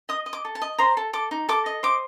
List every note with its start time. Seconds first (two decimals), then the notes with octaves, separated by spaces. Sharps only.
0.09 D#5 D#6
0.26 D#5
0.33 D6
0.45 A4
0.55 A5
0.62 D#5
0.78 C5 A#5
0.97 A4
1.13 A4 D6
1.31 D#4
1.49 A4 D6
1.66 D#5
1.83 C5 D6